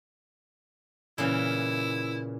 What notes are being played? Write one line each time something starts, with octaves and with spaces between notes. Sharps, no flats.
A#2 C#3 E3 E4